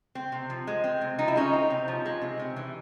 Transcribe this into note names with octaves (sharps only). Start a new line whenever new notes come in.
C4
C3
F3
G#3
C4
C3
F3 D#4
E4
G#3 C#4 D#4
C4
C3
F3
G#3
C3
C3
E3